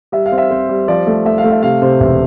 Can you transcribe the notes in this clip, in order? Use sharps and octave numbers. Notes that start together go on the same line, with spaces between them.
G3 E5
F5
C4
E5
C4 C5
G3
F3 D5
A3
A3 E5
F5
A3
E5
C3 F5
C3 C5
E1 E5